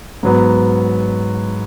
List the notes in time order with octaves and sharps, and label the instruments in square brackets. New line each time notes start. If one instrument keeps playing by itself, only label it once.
[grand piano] G#2 F#3 B3